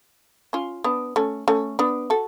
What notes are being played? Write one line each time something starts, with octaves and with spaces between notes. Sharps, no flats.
C#4 F4
B3 D4
A3 C#4
A3 C#4
B3 D4
F#4 A4